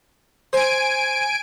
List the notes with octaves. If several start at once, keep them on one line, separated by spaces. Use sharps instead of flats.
C5 G#5 D7